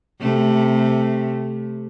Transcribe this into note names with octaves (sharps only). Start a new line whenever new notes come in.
C3 A3